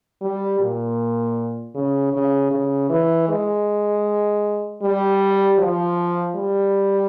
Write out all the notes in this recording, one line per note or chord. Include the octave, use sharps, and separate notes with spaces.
G3
A#2
C#3
C#3
C#3
E3
G#3
G3
F3
G3